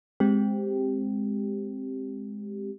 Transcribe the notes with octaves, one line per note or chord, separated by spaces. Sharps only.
G#3 C4 G4